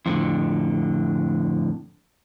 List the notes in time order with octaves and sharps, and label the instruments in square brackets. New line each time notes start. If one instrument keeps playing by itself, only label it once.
[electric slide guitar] F2 A2 D3